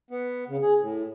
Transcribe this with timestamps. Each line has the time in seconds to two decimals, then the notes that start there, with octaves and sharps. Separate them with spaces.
0.11 B3
0.49 C#3
0.62 G#4
0.81 A2